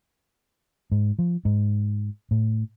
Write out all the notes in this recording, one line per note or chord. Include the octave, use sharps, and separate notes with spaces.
G#2
F3
G#2
A2